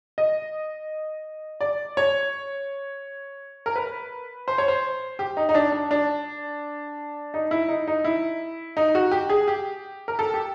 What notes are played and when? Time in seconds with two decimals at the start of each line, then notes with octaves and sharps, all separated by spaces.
0.18 D#5
1.61 D5
1.97 C#5
3.66 A#4
3.76 B4
4.48 C5
4.58 C#5
4.68 C5
5.19 G4
5.37 D#4
5.49 D#4
5.55 D4
5.72 D4
5.91 D4
7.34 D#4
7.51 E4
7.68 D#4
7.87 D#4
8.04 E4
8.77 D#4
8.95 F#4
9.12 G4
9.30 G#4
9.48 G4
10.08 A#4
10.19 A4
10.34 G4